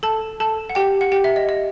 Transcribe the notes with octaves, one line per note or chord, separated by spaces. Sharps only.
A4 A5
A4 A5
F#5
G4 G5
F#5
G4 G5
E5
D#5
D#5